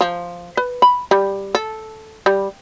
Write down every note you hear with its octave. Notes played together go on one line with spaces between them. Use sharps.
F3
B4
B5
G3
A4
G3